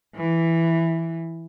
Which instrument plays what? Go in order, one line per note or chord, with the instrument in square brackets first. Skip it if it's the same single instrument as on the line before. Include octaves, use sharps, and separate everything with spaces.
[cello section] E3